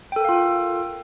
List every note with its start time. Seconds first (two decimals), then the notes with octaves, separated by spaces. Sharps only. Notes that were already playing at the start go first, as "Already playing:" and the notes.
0.12 G5
0.16 A4
0.20 A#4
0.25 F5
0.29 F4